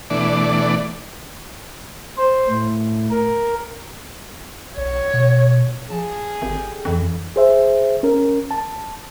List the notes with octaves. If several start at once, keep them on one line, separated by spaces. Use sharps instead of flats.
B2 E3 A3 D4 D5
C5
A2
A#4
B1 C#5
B2
F3 G#4 A5
G#1 D3 G4
F2 D3 E3 F3
G#4 C5 E5
C#4 A#4
A5